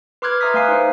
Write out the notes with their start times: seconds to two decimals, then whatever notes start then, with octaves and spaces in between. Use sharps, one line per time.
0.22 B4 C6 D6 F6 F#6 G#6
0.41 B4 E5 A#5 D#6 B6
0.54 A3 F5 G#5 C7
0.68 D#4 C5